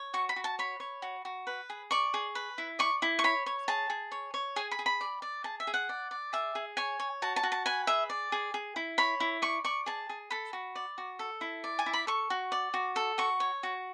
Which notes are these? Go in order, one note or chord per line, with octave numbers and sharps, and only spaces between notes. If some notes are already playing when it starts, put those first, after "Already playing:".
Already playing: C#5
F#4 C#6
B5
F#4
A5
C#5 B5
C#5
F#4
F#4
B4
G#4
D5 C#6
G#4
B4
E4
D5 C#6
E4
C#6
C#5 B5
C#5
G#4 A5
G#4
C#5
C#5
G#4 G#5
B5
G#4
B5
D5
D5
G#4 A5
E5
G#4
F#5
D5
D5
G#4 E5
G#4
C#5 G#5
C#5
F#4 A5
A5
F#4
A5
B4 G#5
G#4 E5
D5
G#4
G#4
E4
C#5 B5
E4
D5 C#6
D5 C#6
G#4 A5
G#4
A4 B5
F#4
D5
F#4
A4
E4
D5
G#5
E4
B5
A4 C#6
F#4
D5
F#4
A4
F#4 C#6
C#5
F#4